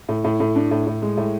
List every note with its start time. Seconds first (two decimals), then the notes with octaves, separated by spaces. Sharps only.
0.09 A2
0.24 A2
0.40 A2
0.56 D4
0.71 A2
0.87 A2
1.02 G#3
1.17 A2